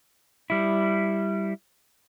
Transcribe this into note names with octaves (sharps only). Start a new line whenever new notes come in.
G3 E4